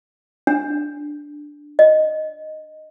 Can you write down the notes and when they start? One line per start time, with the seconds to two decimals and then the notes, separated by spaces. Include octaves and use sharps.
0.47 D4
1.79 D#5